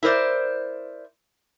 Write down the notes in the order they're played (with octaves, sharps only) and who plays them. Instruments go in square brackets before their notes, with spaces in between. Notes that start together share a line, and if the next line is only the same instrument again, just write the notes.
[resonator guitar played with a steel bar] E4 A#4 C5 D5